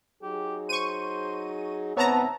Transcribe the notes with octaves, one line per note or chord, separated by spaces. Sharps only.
F#3 D#4 G4 G#4
C5 C#6 D#7
G#2 C#3 B3 C4 C#5 E5 A5 A#5